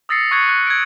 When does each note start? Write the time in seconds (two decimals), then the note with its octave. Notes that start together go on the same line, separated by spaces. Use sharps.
0.09 D#6 E6 A6 A#6 C7 C#7
0.31 C#6 F#6 G#6 C#7
0.49 F#6
0.67 G#6 D7